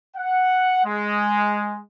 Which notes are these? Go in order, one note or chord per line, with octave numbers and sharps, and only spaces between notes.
F#5
G#3